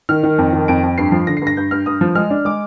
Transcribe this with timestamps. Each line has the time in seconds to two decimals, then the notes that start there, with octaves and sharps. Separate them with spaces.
0.09 D#3 F6
0.23 D#3
0.38 F2
0.53 D#3
0.68 F2 D7
0.83 F2
0.98 G2 C7
1.12 F3
1.27 D3 A#6
1.37 G2 C7
1.47 A#6
1.57 G2 G6
1.71 G2 F6
1.86 G2 D#6
2.01 F3
2.15 G#3 F6
2.30 D4
2.45 G#3 D6